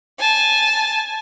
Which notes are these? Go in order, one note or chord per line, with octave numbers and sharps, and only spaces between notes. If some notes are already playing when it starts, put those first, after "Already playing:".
G#5 A5